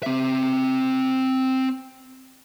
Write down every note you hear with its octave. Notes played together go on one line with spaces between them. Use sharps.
C4 E5